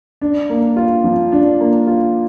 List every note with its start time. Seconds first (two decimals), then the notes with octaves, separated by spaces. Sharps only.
0.21 D4
0.50 A#3
0.77 F4
1.04 F3
1.32 D4
1.60 A#3
1.87 F4